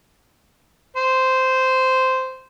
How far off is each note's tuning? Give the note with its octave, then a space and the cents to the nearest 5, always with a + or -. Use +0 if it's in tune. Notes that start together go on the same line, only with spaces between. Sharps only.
C5 -10